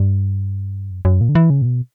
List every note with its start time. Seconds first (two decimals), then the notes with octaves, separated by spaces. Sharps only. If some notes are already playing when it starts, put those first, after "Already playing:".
Already playing: G2
0.91 F#2
1.05 F#2
1.21 A#2
1.29 D3
1.35 E3
1.50 C#3
1.62 A#2
1.66 B2